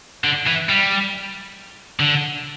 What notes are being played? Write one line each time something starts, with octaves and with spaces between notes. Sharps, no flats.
D3
E3
G3
D3